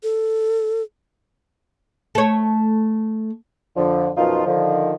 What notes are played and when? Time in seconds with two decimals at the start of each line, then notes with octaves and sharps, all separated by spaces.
0.03 A4
2.15 A3 C#5
3.77 F2 D3 F3
4.17 F#2 B2 F3 D#4 F4
4.47 D3 D#3 F3